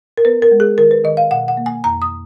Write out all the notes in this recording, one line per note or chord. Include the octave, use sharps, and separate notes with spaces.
A#4
B3 B4
A#4
G#3
G#4
D#3 A#4
B4
D#3 D#5
F5
B2 F#5
F#5
A#3
G#5
F2 A#5
D#6